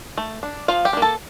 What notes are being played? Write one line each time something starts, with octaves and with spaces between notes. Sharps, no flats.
A3
D4
F3 F4 F5
G4 G5
D4
A#3
A4 A5